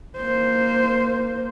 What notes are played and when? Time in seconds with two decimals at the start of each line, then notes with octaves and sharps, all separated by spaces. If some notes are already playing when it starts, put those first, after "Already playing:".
0.17 A#3 C5